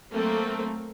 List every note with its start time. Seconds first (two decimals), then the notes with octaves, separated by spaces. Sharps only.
0.11 F#3 A3 A#3 C4